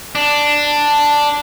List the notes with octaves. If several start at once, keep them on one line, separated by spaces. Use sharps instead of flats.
D4